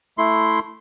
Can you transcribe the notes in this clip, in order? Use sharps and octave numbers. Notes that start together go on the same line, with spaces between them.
A3 E4 C6